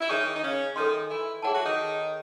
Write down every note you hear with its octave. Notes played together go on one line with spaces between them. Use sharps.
E4
D#3 D#4 G#4 C#5 G#5 C#6
D#4
C#3 C#4
D#3 D#4 A4 D#5 G#5 C6
E3 E4
E3 E4 G#4 C#5 F#5 A5
F#3 F#4
D#3 D#4